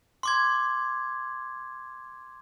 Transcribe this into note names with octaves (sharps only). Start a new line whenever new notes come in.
C6 D6 G#6